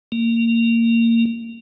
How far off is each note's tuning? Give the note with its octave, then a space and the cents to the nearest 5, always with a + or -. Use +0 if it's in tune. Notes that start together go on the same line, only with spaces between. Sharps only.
A#3 -20